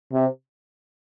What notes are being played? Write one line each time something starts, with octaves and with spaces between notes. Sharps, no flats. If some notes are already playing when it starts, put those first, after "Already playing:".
C3